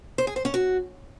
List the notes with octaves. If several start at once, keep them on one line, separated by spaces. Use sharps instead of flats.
C5
G#4
C5
C#4
F#4